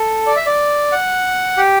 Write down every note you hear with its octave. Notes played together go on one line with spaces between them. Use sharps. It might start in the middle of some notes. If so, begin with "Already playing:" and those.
Already playing: A4
D5
E5
D5
F#5
G4